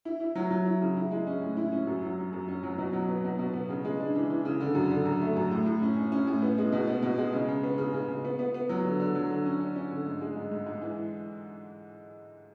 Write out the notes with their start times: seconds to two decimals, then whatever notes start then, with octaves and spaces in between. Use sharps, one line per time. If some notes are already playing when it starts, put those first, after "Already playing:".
0.05 E4
0.20 E4
0.35 F#3
0.51 F#3
0.66 E4
0.81 C#3
0.97 E4
1.11 G#3
1.27 C#4
1.42 A2
1.57 E4
1.72 C#4
1.87 F#2
2.02 F#3
2.18 C#4
2.33 F#2
2.48 C#4
2.63 F#3
2.78 B2
2.93 F#3
3.08 B3
3.24 B2
3.39 B2
3.53 B3
3.69 C#3
3.85 G#3
4.00 D4
4.15 E3
4.30 E3
4.45 C#3
4.60 D3
4.75 F#2
4.90 D3
5.06 F#2
5.21 A3
5.36 F#2
5.51 A2
5.66 A2
5.82 C#4
5.97 C#4
6.12 C#4
6.27 A2
6.42 B3
6.58 G#3
6.72 B2
6.87 B3
7.03 B2
7.18 G#3
7.33 C#3
7.48 C#3
7.63 B3
7.78 C#3
7.94 C#3
8.08 C#3
8.25 B3
8.39 B3
8.54 B3
8.69 F#3
8.84 D3
9.00 D3
9.15 F#3
9.30 D3
9.45 C#4
9.60 C#4
9.76 C#4
9.90 D3
10.06 G#2
10.21 G#3
10.36 G#2
10.52 G#2
10.66 G#2
10.82 E3